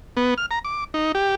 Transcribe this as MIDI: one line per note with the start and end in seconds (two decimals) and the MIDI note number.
0.17 0.34 59
0.38 0.46 89
0.51 0.59 82
0.65 0.84 86
0.94 1.12 63
1.15 1.35 67